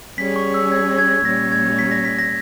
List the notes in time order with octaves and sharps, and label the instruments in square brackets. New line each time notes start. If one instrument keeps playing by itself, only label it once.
[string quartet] G3 C#4 G#4 C#5 [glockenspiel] B6
[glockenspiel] C#6
E6
G#6
G#6
[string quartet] A#2 G3 C#4 [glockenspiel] A#6
[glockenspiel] G#6
B6
A#6
B6
A#6